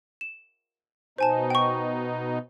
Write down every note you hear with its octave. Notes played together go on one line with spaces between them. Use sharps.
E7
B2 D#4 C5 G#5 A5
G5 C#6